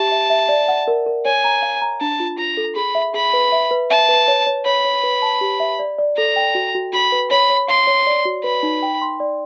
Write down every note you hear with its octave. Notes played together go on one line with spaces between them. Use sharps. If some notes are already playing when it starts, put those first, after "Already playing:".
Already playing: G4 E5 A5
E5
E5
D5
F#5
A#4
A#4
C#5 G#5
A#5
F5
A#5
D4 A5
F4
F4 A#5
A4
G#4 B5
E5
G#4 B5
B4
E5
B4
E5 A5
B4
C#5
C#5
C#5 B5
C#5
B4
A5
G4
E5
D5
D5
A4 A#5
G5
F#4
F#4
F#4 B5
B4
C#5 B5
C#5
F5 C6
C#5
D5
F#4
B4 B5
D#4
G5
C6
D5